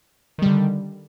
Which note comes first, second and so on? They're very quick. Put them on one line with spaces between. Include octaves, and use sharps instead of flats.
D#3 G3 D3